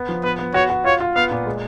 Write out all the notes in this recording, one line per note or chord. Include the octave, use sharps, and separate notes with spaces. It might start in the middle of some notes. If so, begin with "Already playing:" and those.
Already playing: B3
F3
B3 B4
B3
F#4 C#5
F#4
F4 C#5
F4
B3 F5
A#2
G#3